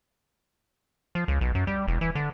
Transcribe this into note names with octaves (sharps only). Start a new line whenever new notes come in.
F3
C#2
B1
F#2
G3
E1
E3
D3